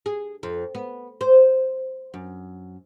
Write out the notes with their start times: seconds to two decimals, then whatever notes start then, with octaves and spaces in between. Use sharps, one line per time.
0.06 G#4
0.43 F2
0.75 B3
1.21 C5
2.14 F#2